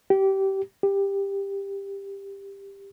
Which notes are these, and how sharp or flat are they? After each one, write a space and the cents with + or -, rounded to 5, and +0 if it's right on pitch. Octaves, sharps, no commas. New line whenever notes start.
G4 -20
G4 +15